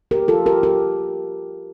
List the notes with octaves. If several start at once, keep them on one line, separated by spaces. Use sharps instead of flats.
G4 A#4
F4 A4
G4 A#4
G4 A#4